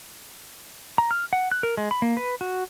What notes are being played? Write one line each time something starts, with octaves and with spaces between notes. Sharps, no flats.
A#5
F6
F#5
F#6
A#4
G#3
B5
A#3
B4
F#4